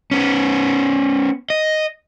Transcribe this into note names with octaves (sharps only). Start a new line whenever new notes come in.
B3 C#4
D#5